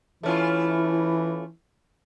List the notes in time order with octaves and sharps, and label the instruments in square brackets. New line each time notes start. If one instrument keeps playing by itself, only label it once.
[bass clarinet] E3 [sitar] A3 C#4 F4 [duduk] E4